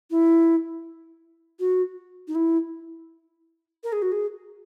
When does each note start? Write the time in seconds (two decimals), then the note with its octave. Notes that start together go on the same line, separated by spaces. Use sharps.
0.10 E4
1.59 F#4
2.28 D#4
2.35 E4
3.84 A#4
3.92 G#4
4.02 F#4
4.12 G#4